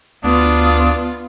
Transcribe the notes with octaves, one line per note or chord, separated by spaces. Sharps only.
D2 B3 D4 F4 D#6